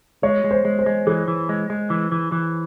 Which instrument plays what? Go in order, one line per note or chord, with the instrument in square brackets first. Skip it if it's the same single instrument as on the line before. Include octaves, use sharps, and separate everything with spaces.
[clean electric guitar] G#3 [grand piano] C#5
[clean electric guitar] G#3
[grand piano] C5
[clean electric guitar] G#3
[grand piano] C5
[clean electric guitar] G#3
[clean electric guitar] E3 [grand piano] G#4
[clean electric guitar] E3
G#3
G#3
E3
E3
E3